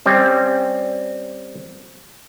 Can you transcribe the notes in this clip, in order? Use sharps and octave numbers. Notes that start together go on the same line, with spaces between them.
G3 C4 C#4